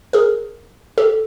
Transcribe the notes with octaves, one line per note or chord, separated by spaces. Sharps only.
G#4 A#4
G4 A4